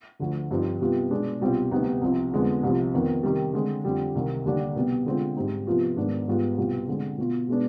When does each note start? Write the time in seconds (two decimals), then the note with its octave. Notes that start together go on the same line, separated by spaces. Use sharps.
0.19 D2 D3 F3
0.51 G2 F3 C4 D#4
0.80 C3 G3 B3 F4
1.11 B2 G#3 D4
1.41 C2 B2 G3 C4 F4
1.71 D2 C3 G3 B3 D#4
2.01 C2 C3 F3 C4
2.33 F2 D3 G#3 B3
2.63 C2 C3 F3
2.94 F2 D#3 B3
3.23 C3 D#3 G3
3.53 D3 G#3 C4
3.84 F2 D3 G3
4.15 C2 C3 D#3
4.45 D#2 D3 G3 D4
4.76 C2 B2 G3 B3
5.06 D3 G#3 C4 F4
5.37 G#2 G3 C4 D#4
5.67 C3 F3 B3 F4
5.96 G#2 D#3 B3 D4
6.27 G#2 G3 B3 F4
6.58 C2 B2 G3 B3 F4
6.88 D3 G#3 C4
7.18 B2 B3 F4
7.48 B2 G#3 B3 D4